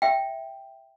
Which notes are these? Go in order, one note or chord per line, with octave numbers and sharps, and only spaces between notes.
E5 G5